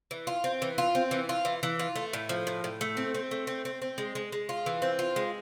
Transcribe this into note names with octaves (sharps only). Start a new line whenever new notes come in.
E3
F4
C4
E3
F4
C4
E3
F4
E3
E3
F4
A3
A2
F3
A2
A2
A3
C4
C4
A3
C4
C4
C4
G#3
G#3
G#3
F4
E3
C4
F4
G#3